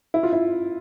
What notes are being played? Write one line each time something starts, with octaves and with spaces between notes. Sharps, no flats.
E4
F4
E4